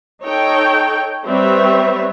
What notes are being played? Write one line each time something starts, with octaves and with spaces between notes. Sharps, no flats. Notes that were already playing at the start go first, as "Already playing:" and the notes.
D#4 A4 C#5 G5
G3 C4 B4 C#5 E5